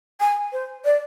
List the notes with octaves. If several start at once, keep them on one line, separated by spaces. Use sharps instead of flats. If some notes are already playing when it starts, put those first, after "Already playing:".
G#5
C5
D5